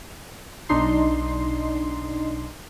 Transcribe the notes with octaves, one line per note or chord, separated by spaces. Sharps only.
B1 D4 D#4 C6